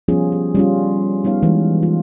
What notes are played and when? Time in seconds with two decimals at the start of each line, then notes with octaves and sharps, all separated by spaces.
0.08 F3 G3 B3 C#4 F4 G#4
0.32 G4
0.55 G3 C#4 F4
1.24 G3 B3 D#4 C#5 F5
1.43 E3 G3 G#3
1.83 F4